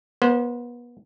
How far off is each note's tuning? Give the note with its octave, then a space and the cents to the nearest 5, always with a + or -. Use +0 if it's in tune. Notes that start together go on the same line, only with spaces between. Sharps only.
B3 -35 C5 +0